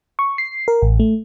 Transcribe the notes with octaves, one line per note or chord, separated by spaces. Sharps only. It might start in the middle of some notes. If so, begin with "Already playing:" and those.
C#6
C7
A#4
A1
A3